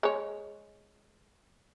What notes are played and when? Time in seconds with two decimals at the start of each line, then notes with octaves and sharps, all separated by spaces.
0.03 G#3 C#5